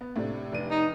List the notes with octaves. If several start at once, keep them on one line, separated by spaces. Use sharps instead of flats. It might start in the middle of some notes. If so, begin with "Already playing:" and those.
B3
A2 C3 D4
F1 D4 D#7
D#4